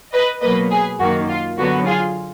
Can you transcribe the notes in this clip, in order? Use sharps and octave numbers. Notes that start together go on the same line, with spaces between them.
B4 D#5
B2 F#3 A#3 B4 D#5
G#4 B4
F#2 D#3 A#3 F#4
F4
D3 F#3 B3 F#4
F4 G#4